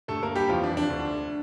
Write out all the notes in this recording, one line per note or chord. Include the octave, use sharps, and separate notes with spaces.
G2 D3 A3 A4
A#3 A#4
G3 G4
F2 E3 F3 F4
D4
D4
D2 D3